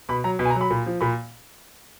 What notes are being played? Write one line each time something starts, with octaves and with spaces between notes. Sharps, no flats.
B2 B5
F#3 A#5
B2
G#5
A#5
F#3
B5
A#2
F3
A#2 B5